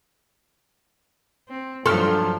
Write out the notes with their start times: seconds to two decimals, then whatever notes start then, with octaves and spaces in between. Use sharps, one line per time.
1.49 C4
1.86 G2 F3 F#3 A4 C6 F6